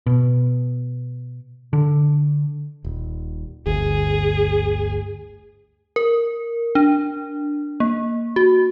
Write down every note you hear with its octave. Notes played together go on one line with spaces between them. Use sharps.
B2
D3
D#1
G1 D2 G#4
A#4
D4
A#3
F#4